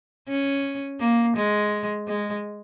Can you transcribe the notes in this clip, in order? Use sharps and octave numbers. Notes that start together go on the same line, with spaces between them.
C#4
A#3
G#3
G#3